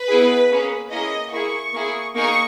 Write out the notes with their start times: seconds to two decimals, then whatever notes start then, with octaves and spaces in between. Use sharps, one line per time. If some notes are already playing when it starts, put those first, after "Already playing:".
Already playing: B4
0.09 B3 E4 G#4
0.50 A#3 C#4 G#4
0.91 A#3 C#4 E4 G#4 D#5
1.33 A#3 E4 G#4 C#6
1.74 A#3 E4 G#4
2.15 A#3 D#4 G#4 C#6